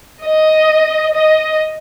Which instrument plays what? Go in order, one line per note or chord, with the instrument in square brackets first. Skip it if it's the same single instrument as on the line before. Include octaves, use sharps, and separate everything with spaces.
[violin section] D#5
D#5